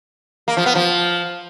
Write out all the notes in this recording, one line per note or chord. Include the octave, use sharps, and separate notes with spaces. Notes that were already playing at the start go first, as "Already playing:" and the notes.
A#3
F3
B3
F3